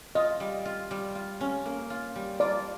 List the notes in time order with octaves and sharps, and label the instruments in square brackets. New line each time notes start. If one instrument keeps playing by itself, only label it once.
[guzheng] F4 [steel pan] D#5
[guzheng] G3
F4
G3
F4
C#4
A#3
F4
G3
[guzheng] F4 [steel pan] D5